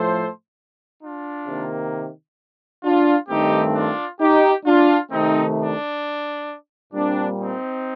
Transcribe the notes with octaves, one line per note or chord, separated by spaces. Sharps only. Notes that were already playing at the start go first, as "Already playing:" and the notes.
Already playing: A2 F3 A3 A4 C5
D4 F4
C3 D#3 A#3
D4 F4
G2 D#3 A3 C4 D#4 G4
D4 F4
D#4 G4
D4 F4
C3 D#3 A3 C4 D#4
D4
A#2 G3 C4 D4
C4 D#4